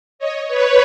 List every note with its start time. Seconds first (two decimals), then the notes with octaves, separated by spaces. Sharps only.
0.19 C#5 D#5
0.48 B4 C#5